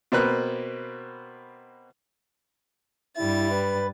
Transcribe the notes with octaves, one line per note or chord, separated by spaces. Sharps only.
B2 A#3 C4 B4 F#6
G2 G3 E4 A6
B4